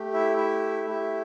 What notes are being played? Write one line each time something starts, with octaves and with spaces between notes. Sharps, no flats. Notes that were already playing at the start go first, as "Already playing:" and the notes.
Already playing: A3 G4
E4 E5
E4 E5
A3 E4 G4